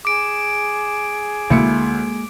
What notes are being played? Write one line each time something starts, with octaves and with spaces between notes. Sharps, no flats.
G#4 D6 D7
D2 G#3 A#3 E4 C#7